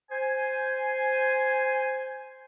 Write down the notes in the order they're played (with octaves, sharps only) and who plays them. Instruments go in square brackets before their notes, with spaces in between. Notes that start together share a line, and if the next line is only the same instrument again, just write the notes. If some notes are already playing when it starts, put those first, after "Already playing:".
[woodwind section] C5 G#5